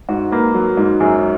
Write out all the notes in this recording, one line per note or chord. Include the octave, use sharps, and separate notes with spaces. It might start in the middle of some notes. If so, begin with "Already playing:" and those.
G#2 F#4
A#3 B4
F#3
G#2
F#2 G#4